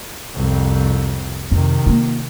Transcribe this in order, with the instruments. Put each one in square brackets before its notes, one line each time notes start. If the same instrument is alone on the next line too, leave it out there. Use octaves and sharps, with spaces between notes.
[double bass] C2 F2
[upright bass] F2 [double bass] C3 D#3
[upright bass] A#3 F4